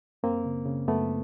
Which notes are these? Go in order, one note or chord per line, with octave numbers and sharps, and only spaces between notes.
F#2 A#3 C4
C#3
C#3
F#2 A3 B3